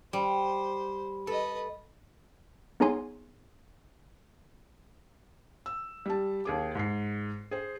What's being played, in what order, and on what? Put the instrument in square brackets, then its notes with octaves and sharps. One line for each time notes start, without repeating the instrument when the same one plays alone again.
[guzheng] G3 [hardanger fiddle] C5
[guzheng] A4 [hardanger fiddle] B4 D#5
[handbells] B3 D#4 G#4 C#5 G#5 C6
[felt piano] E6
G3 A5
D#2 G#4 D6
G#2 C7
G#4 C5